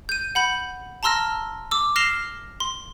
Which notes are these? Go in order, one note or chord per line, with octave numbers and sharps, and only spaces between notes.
G6 D#7
F#5 B5 G6
A5 A#5 C6 E6 F6 A#6
D6 E6
F6 A#6 C7 E7 F7 G7
C6